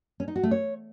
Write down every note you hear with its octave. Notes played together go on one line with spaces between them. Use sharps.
C#4
D#4
F#4
A3
C#5